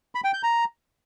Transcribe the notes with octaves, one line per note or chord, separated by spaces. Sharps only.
B5
G5
G6
A#5